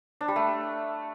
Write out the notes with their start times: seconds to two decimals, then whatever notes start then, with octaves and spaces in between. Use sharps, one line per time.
0.21 D4
0.28 G3
0.36 A3